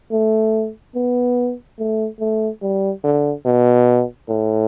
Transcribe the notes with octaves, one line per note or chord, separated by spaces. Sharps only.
A3
B3
A3
A3
G3
D3
B2
A2